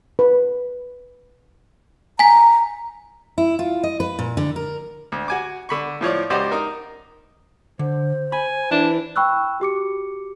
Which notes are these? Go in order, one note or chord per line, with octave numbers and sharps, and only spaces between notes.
B4
G#5 A#5 B6
E4
F4
D#5
B4
A#2
D3
A#4
D2
F#4 G#5 D6
D3 B5 C#6
A2 F3 C#5 D5
C#2 F#4 G4 C5 D5 D#5
D#4 A#4
D3 C5
G#5 B5
E3 D4 E4
G5 B5 C#6 E6 F#6
F#4 G4 D6 C#7